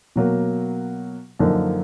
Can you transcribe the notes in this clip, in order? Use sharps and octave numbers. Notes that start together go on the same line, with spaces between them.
B2 F#3 A#3
F#2 D3 F3 A#3 D#4